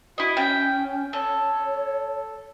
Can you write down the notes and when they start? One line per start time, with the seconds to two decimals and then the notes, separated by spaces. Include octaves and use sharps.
0.18 E4 F#4 D#5
0.37 C#4 G5
1.13 A4 C#5